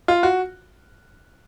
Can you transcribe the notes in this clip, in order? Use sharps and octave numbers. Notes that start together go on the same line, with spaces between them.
F4
F#4